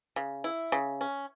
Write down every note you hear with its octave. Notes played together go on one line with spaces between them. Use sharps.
C#3
E4
C#3
C#4